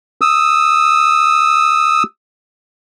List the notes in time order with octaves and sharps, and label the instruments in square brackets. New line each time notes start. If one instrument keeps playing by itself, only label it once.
[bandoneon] D#6 E6